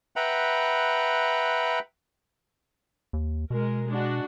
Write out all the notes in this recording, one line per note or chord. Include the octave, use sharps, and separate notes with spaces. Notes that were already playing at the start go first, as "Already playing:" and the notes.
B4 E5 F#5 G5 A#5 B5
D#2
B2 G#3 A#4
G#3 D4 F#4